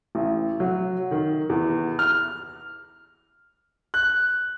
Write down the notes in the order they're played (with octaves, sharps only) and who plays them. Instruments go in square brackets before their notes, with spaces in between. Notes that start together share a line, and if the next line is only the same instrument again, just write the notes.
[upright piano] A1
F#3
D#3
E2
F6
[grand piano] F#6